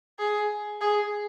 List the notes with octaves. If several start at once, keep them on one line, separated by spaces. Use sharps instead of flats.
G#4
G#4